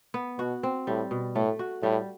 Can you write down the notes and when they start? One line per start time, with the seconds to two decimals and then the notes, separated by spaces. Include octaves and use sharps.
0.14 B3
0.38 B2 F#4
0.63 C4
0.87 A2 G3
1.11 B2
1.35 A2 A3
1.59 F#4
1.83 A2 G3